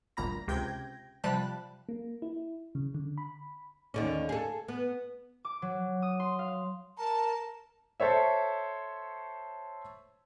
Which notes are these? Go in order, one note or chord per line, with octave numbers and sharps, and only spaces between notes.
G1 D2 A#2 A#5 B5 A#6
C#2 C3 G5 G6 G#6 A#6
C3 F3 G3 A5 B5 F#6
A#3
E4
C#3
D3
B5
D#2 D3 C#4
G#4 A4
B3
D6
F#3
D#6
C6
F5
A#4 A5
A4 C5 C#5 E5